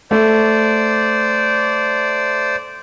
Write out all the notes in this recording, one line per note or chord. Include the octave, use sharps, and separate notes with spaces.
A3 C5 D5